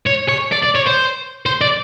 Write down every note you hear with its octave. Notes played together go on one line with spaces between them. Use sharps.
C#5
C#5
D5
D5
C#5
C5
C5
D5